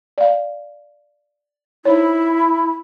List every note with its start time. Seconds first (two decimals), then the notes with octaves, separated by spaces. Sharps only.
0.18 D5 F5
1.85 D#4 E4 C5 C#5